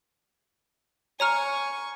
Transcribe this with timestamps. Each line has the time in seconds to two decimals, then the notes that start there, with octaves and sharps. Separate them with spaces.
1.20 C#5 G#5 A#5 C#6 F6